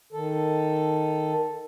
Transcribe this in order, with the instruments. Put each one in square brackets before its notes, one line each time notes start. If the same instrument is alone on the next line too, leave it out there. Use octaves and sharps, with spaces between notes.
[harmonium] D#3 A4